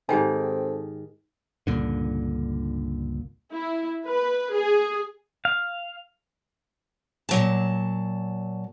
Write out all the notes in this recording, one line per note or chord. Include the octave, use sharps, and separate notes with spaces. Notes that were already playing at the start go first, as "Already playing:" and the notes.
G#2 D#3 C4 G4 A4 G5 G#5
C#2 G2 A#2 D3
E4
B4
G#4
F5
A#2 F#3 A5